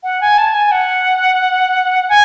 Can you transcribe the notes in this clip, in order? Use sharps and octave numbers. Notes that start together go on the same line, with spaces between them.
F#5
G#5
A5
G#5
F#5
G#5